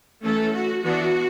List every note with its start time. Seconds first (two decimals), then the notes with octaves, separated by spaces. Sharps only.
0.23 E3 A3 C#4 A4
0.53 F#4
0.83 E3 B3 D4 F#4